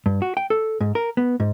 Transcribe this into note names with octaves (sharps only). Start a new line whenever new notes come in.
G2
F#4
G5
A4
G#2
A#4
B3
G#2